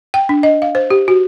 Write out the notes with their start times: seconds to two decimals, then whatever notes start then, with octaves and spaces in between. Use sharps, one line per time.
0.14 G5
0.29 D4
0.43 D#5
0.62 F5
0.75 C5
0.90 G4
1.08 F#4